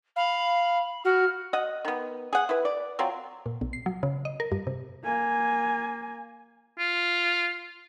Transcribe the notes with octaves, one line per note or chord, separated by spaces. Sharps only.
F5 B5
F#4 F6
D#5 F#5
D#3 B3
G#4 F#5
E4 B4
D5
F#3 C4 F4
A#2
B1
C7
F#3
C#3
D#5
A#4
G2
C3
A#3 G#5
F4